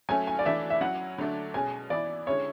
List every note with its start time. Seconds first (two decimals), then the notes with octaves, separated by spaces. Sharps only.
0.09 F#3 A3 C#4 G#5
0.27 G#5
0.39 D5
0.45 E3 A3 D4 E5
0.70 E5
0.81 F#3 C#4 E4 F#5
1.18 D3 F#3 A3 D4
1.54 B2 G#3 C#4 G#5
1.90 E3 B3 E4 D5
2.27 D3 G#3 C#4 E4 C#5